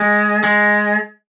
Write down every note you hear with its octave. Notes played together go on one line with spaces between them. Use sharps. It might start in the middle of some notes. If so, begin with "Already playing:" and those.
Already playing: G#3
G#3